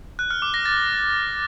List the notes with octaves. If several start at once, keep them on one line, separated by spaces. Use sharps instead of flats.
F#6
F6
D6
A#6
A6